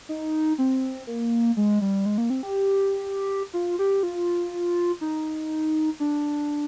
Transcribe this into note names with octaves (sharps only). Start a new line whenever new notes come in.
D#4
C4
A#3
G#3
G3
G#3
A#3
C4
G4
F4
G4
F4
D#4
D4